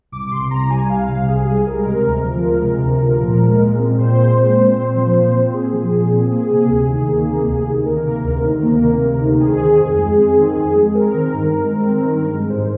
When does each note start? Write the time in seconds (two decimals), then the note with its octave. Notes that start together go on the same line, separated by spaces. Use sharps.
0.12 C2 D6
0.27 D6
0.32 C3 C6
0.51 C2 A#5
0.70 G3 G#5
0.89 C2 F5
1.08 C3
1.28 C2 G#4
1.48 G3
1.66 G#3 A#4
1.86 C3
2.06 D2
2.24 F3
2.44 G#3
2.63 C3
2.82 D2
3.02 F3
3.22 A#2
3.41 G#3
3.61 A#2
3.79 C4
3.99 A#2 C5
4.18 G#3
4.38 A#2
4.57 C4
4.76 A#2
4.96 F3
5.15 A#2
5.34 C4
5.53 A#2 G#4
5.73 F3
5.92 A#2
6.12 C4
6.31 A#3 G#4
6.51 C3
6.69 D2
6.89 D#3
7.08 A#3
7.27 C3
7.47 D2
7.66 D#3
7.86 A#3 A#4
8.05 C3
8.24 D2
8.43 D#3
8.63 A#3
8.82 C3
9.02 D2
9.21 D#3
9.40 C4 G#4
9.60 D#3
9.79 F2
9.98 G#3
10.18 C4
10.37 D#3
10.56 F2
10.75 G#3
10.95 C4 A#4
11.14 D#3
11.33 G2
11.53 G#3
11.73 C4
11.91 D#3
12.11 G2
12.30 G#3
12.50 G#2 C5